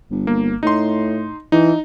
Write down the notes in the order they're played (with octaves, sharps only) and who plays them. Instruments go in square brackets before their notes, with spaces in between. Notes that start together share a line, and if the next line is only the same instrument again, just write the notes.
[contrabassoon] G1
[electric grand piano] A#3
[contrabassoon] A2 [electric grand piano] D#4 C6
[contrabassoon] E3 [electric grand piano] D#4